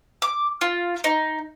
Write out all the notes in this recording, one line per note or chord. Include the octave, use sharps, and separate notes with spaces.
D6
F4
D#4